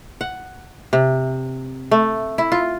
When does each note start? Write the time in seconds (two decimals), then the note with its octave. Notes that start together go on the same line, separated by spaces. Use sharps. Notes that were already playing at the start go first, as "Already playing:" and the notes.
0.21 F#5
0.93 C3
1.91 A3
2.38 E4
2.52 F4